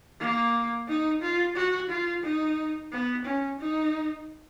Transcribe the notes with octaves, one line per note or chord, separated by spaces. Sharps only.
A#3
D#4
F4
F#4
F4
D#4
B3
C#4
D#4